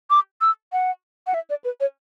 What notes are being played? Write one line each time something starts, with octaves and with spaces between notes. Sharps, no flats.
D6
E6
F#5
F#5
E5
D5
B4
C#5